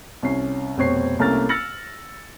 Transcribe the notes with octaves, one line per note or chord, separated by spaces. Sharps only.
C2 C#4 C7
F1 B2 C4 C#5 C7
C2 A3 A#3 C#4 F6 A6
E6 F6 A6 A#6 C#7 F#7